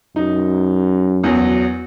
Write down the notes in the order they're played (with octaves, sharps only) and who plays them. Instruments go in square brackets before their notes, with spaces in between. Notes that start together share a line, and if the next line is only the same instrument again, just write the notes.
[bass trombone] F#2 [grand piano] D#4
[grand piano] E2 F#3